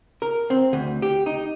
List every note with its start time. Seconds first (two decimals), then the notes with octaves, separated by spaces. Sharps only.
0.22 A#4
0.50 C4
0.73 D2
1.02 G4
1.26 D#4